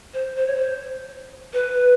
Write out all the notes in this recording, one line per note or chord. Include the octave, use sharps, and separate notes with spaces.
C5
C5
C#5
C5
B4